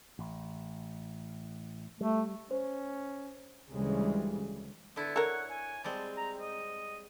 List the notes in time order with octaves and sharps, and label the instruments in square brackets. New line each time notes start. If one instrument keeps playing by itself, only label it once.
[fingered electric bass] A1
[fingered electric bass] G3 [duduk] A3
[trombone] C#4 [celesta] C5
[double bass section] D2 C#3 E3 G3 G#3
[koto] D3 E4 [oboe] B3
[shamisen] A4 A#4 [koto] C#5 [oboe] F#5
[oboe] G#5
[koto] G3 G#3 C4 [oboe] A5
[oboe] A#5
D#5